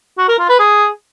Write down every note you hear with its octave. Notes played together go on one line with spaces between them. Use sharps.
F#4
A#4
F4
B4
G#4